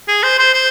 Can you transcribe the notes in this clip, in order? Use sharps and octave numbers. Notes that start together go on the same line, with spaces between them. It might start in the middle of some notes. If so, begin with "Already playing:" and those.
G#4
C5
C5
C5